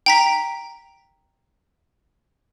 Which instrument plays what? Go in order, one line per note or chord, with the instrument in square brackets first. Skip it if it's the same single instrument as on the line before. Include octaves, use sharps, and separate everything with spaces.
[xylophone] G5 A#5 B6